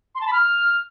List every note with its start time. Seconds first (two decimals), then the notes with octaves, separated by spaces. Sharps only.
0.15 C6
0.21 A5
0.27 B5
0.33 F6